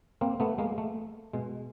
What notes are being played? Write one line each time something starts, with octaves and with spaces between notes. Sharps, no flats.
A#3 C4
A3 B3
G#3 A#3
A3
B2 G#3